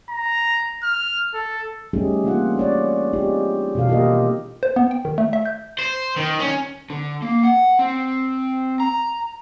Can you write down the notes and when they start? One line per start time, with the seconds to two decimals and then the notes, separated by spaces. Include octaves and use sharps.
0.10 A#5
0.83 F6
1.35 A4
1.93 G3 A3 C#4 D#4 G4 G#4
2.24 E3 A#3 C4 D4 F4 F#5
2.57 C#4 C#5 D5
3.13 C4 D4 D#4 F4 G4 G#4
3.75 B2 D#3 E3 F#4 A4 F5
3.88 A#3 F4 G4 A#4 D#5
4.63 C5
4.76 B3
4.91 G5
5.05 D#3
5.18 A3
5.33 E5
5.45 G6
5.79 C5
6.16 D#3
6.40 C#4
6.90 D3
7.22 A#3
7.43 F#5
7.79 C4
8.80 A#5